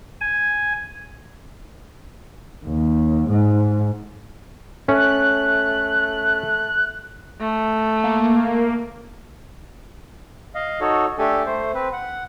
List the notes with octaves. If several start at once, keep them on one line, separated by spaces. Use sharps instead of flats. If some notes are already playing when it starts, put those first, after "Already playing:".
G#5
D#2
G#2
A3 C#4 F#6
A3
A#3
D#5 F5
D#4 F#4 A4 C#5
A3 D4 G4 A4 G#5
A3 C5
C4 B4
F#5